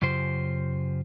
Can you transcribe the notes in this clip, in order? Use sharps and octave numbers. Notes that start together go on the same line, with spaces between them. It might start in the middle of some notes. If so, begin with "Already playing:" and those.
F#2 C#3 F4 G4 C5